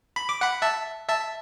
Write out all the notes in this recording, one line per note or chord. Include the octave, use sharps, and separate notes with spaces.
B5
D6
F#5 B5
E5 A5
E5 A5